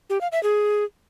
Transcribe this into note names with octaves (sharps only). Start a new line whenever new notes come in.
G4
F5
E5
G#4